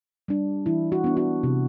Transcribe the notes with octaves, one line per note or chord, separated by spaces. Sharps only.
G3 D4
E3 E4
F#4
B3 D4
F#4
C3